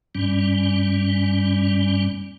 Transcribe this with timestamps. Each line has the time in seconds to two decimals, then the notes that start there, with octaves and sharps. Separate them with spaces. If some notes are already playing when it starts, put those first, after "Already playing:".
0.15 G2 G3 C#4